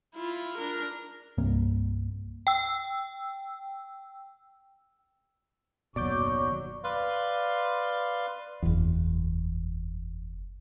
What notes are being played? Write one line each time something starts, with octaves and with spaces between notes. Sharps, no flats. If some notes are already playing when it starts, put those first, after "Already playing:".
E4 F4
D4 A#4
C2 G2 C3 A#3
G5 E6
F#1 D#2 B2 F#3 D5 C#6 D6 G6
B4 D5 F5 C6
F#1 E2